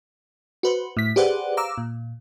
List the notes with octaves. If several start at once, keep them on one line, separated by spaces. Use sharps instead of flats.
F#4 B4 C5
A2 B6
G4 G#4 B4 C5 D5 F#5
F5 A#5 D6 E6
A#2